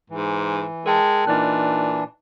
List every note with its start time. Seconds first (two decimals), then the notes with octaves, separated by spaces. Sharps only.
0.10 G#2 E3
0.86 G#3 A#4 G5 A5
1.27 A#2 E3 D4 D#4 F#6